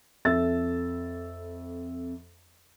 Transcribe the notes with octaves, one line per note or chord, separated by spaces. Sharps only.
F2 A4 E5 E6 A6